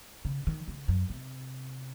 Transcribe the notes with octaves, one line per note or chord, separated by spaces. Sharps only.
C#3
D#3
C#3
F#2
C3